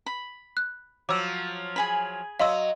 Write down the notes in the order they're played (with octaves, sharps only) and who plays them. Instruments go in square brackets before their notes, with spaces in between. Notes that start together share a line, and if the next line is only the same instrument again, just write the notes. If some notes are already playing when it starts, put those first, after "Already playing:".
[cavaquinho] B5
[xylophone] F#6
[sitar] F3 F#3 [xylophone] D6 E6
[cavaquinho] G#4 G#5 B5
[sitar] F#3 D#5 [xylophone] F5 C6 E6